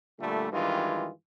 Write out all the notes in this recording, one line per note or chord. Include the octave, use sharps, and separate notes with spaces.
A#2 D3 G3 A3
G2 D#3 E3 G#3 F4